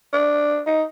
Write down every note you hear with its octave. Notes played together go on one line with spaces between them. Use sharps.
D4
D#4